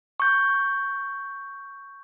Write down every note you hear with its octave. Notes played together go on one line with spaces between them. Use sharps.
C#6 G6